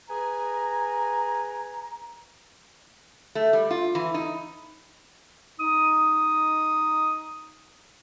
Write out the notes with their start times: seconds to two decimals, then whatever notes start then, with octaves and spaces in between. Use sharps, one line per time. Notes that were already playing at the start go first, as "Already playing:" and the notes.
0.09 G#4 B4 G#5 A#5
3.35 A3
3.53 G3
3.70 F4
3.95 E3
4.14 D#4
5.59 D#4 D#6